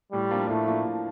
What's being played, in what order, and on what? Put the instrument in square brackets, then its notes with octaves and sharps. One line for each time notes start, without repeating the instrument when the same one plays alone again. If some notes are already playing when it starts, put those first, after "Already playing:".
[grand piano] A2 [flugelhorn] G3
[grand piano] F3 A#3 D4 F4
[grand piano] A2 [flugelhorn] A3
[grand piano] F3 A#3 D4 F4
A2